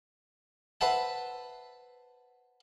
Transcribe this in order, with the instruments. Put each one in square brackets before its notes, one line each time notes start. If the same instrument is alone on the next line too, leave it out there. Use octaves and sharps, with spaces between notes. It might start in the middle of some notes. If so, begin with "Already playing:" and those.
[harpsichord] B4 C5 E5 F#5 A5